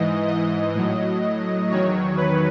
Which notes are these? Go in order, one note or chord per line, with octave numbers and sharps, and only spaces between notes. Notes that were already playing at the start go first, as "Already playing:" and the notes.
Already playing: G#2 E3 D#5
D#5
A2 F#3
E2 D#3 F#3 C#5
B4